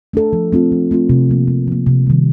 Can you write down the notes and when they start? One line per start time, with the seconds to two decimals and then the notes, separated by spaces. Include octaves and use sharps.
0.13 A3 D4 A4
0.33 F3
0.53 A3 C4 F4
0.72 F3
0.91 A3 C4 F4
1.09 C3
1.29 F3 A#3
1.48 C3
1.68 F3 A#3
1.86 C3
2.07 D#3 G3